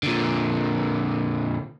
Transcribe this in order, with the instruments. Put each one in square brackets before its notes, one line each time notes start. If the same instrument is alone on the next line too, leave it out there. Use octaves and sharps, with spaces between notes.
[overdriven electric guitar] A#2 D3